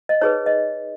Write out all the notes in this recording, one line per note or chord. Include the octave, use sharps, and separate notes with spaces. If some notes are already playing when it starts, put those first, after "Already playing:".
D#5
D#4 G#4 B4 C#5
D#5